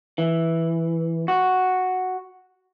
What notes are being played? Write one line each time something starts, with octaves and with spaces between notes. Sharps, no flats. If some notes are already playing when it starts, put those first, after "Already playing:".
E3
F#4